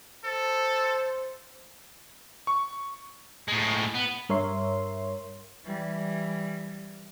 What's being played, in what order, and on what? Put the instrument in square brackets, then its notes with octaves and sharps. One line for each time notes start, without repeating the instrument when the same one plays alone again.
[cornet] A4 [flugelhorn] C5
[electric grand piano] C#6
[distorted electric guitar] A2 G#3
B3
[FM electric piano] G2 A#4 C#5 E5 C6
[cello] E3 G3